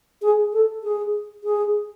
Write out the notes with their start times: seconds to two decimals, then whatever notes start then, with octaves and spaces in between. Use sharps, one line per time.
0.22 G#4
0.53 A4
0.84 G#4
1.44 G#4